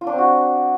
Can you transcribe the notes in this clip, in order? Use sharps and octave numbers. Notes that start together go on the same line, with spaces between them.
F4
D4
C4
F#4